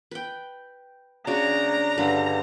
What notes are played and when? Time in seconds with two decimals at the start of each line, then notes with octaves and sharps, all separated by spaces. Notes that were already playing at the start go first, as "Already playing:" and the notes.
0.11 B4 G5
1.27 C#3 D4 F#4 A#5
1.98 G2 D3 B4 F5